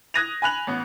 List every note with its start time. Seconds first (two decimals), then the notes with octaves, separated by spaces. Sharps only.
0.14 D#6 F#6 G#6 A#6 D#7 F7
0.42 G#5 B5 F#6 F7 F#7
0.67 A1 B3